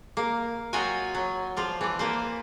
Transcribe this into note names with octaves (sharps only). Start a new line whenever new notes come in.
A#3
F#3 F4 F#4 D#5 G5 G#5
F#3
F3 F4 D5
E3 D5
A#3 B4 C5